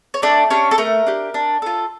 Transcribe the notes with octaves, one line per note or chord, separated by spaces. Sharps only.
C#5
A3 D4 D5
C#4 D4 G4 C#5
A4
A3 A#4
D4 G4
D4
F4 A4